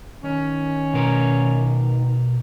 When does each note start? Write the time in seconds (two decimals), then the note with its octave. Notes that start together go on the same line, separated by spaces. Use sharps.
0.23 D#3 C#4
0.94 B2 A#4